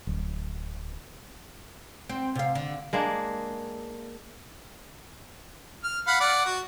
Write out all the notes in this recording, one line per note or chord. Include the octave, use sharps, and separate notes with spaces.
D1
C4
C3 F5
D3
G#3 A#3 D4
F6
F5 F#5 B5
D5 F#5
F#4